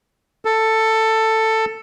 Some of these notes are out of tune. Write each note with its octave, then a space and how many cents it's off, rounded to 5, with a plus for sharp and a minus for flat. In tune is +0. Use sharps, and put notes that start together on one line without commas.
A4 +10